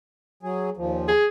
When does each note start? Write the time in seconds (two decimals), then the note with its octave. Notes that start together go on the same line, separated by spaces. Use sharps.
0.43 F#3 G#4
0.77 D#2 A#2 F3
1.08 G#4